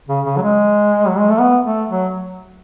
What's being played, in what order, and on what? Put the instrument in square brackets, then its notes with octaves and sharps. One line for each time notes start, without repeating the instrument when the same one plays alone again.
[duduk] C#3
C#3
F#3
G#3
F#3
G#3
A3
B3
A3
F#3